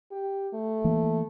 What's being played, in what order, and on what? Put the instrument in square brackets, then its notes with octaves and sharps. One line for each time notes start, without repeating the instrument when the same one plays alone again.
[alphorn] G4
A3
[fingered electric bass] E3 A#3